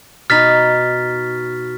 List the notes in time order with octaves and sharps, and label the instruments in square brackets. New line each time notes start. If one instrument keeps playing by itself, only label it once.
[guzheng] B2 D#4 [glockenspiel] F6 A6 B6